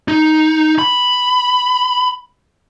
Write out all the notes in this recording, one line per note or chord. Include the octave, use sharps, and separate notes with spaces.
D#4
B5